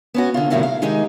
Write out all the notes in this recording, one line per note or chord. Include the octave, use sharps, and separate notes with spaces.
B3 C#4 F#4
D3 F4
A2 C3 D#3 G3 E4 F#4
F5
D#3 G#3 D#4 G4 G#4